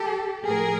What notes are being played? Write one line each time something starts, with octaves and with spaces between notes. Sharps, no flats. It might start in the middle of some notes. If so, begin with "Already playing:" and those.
Already playing: G4 A4
A2 F3 A3 G#4 A#4